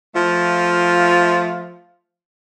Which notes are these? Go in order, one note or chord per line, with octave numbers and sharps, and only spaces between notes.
F3 A3 F4